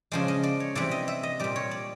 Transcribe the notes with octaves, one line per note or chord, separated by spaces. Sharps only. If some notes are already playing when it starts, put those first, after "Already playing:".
C#3 F3 G#3 D5
D#5
D5
C#5
C3 E3 G3 D5
D#5
E5
D#5
A#2 G3 D5
C#5
D5